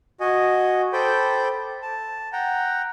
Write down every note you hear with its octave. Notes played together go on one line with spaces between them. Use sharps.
F#4 D#5 G#5
A4 C5 G5 B5 D6 G6
A5
F#5 G5 A#5